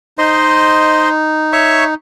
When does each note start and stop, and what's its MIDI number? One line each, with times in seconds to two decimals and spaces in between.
0.18 1.94 63
0.18 1.09 72
0.18 1.09 75
0.18 1.09 84
1.53 1.84 73
1.53 1.84 76
1.53 1.84 85